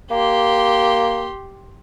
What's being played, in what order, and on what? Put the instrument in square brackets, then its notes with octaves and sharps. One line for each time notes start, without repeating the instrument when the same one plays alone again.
[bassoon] A#3 [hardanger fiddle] G4 C6